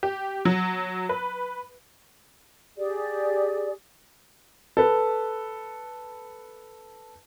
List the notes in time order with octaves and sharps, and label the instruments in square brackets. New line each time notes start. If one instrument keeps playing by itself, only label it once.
[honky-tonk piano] G4
F#3
B4
[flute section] G4 G#4 D5
[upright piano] A4 B4